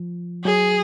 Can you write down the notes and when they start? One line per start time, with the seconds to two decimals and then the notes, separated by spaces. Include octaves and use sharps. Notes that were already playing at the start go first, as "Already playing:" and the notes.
Already playing: F3
0.45 F#3 G#4